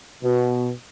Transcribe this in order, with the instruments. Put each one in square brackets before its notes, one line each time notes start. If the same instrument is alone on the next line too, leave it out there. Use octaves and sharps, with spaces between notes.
[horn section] B2